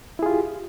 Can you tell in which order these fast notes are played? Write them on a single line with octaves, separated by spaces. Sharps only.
E4 G#4 F4 G4